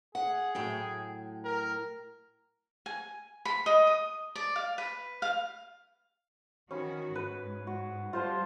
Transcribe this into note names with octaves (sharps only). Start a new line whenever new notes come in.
G#4 F#5
A2 F#3 G5
A#4
G#5
B5
D#5
D#6
D5
F5
B4
F5
D#3 C#4 F#4 B5
G#2 B4
F#4
G3 F4 C5 A5